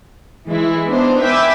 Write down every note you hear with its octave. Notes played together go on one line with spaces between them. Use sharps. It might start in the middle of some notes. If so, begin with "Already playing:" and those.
E3 G#3 E4
B3 D4 D#4 C5
B4 E5 G5 G#5 B5 D6